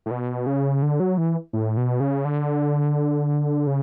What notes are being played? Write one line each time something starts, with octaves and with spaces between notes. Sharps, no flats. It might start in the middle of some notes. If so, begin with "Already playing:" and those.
A2
B2
C#3
D3
F#3
E3
A2
B2
C#3
D3
C#3